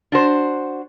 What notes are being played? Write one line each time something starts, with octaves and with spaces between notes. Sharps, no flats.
D4 F#4 C5